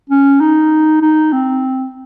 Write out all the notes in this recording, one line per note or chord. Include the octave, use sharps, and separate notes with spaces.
C#4
D#4
D#4
C4